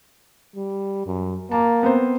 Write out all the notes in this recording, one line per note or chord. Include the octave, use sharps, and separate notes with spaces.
G3
F#2
A#3 A5
B3 C4 C5